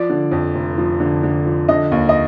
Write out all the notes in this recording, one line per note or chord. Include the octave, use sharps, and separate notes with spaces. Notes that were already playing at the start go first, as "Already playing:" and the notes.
Already playing: F3 D5
D3
F2
F1
F3
D3
D3
F3
D3 D#5
D#2
D#5